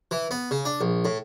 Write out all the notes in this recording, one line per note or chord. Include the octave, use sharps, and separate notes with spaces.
E3
B3
C#3
D4
A#1
A2